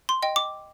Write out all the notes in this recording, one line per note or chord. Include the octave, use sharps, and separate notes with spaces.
C6
D#5 G5
D6